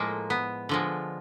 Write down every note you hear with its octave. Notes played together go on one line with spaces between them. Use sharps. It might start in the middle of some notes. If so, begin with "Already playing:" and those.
Already playing: A2 F3 G#3 A#3
B3
D3 F3 G#3